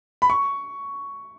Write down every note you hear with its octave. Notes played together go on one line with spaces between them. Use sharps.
B5
C#6